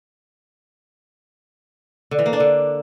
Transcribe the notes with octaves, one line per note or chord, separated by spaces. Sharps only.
D3
E3
A#3
D4
D3